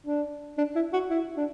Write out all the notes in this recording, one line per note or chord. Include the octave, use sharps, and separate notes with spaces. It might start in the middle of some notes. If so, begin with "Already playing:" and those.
D4
D4
E4
F#4
E4
D4